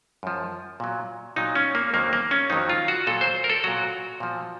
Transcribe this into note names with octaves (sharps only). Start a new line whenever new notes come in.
F#2 F3
A#2 F#3
A#2 F#3 D#4
C#4
A#3
F2 D#3 F#3 A#3
A#3
C#4
F2 D#3 F#3 D#4
F4
F#4
A#2 F#3 A4
C5
A#4
A4
A#2 F#3 F#4
A#2 F3